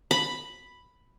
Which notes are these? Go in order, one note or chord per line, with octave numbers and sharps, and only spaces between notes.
B5